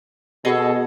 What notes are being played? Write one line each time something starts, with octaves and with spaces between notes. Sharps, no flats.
B2 G#4 A4 D#5